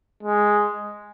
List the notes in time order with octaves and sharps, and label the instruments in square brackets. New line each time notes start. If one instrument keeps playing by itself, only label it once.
[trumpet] G#3